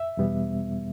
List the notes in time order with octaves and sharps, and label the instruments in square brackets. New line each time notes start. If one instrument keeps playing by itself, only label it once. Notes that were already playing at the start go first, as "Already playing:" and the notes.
Already playing: [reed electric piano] E5
E2 B2 G3 B3